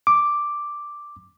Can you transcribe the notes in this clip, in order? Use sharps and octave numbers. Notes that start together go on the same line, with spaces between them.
D6